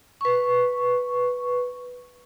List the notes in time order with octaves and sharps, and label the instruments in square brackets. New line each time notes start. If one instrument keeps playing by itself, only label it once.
[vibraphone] B4 C#6